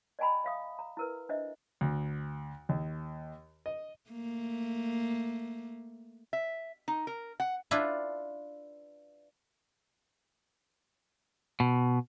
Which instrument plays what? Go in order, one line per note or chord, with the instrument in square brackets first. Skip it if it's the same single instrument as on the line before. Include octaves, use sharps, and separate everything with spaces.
[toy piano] D5 D#5 G5 G#5 A#5 B5
E5 F5 D#6
A#5
E4 A#4 B4
D4 C5 D#5 E5
[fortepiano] D2
D#2
D#5
[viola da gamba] A3 A#3
[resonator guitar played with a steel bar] E5
D#4
A#4
F#5
[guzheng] D4 E4 F4 B4 E5
[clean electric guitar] B2